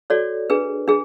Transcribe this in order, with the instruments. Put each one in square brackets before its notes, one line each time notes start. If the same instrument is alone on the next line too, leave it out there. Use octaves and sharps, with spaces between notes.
[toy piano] F#4 A4 C#5 D5
D4 G#4 B4
D4 G#4